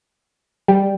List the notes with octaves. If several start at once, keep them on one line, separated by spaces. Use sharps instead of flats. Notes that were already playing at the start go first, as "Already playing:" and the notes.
G3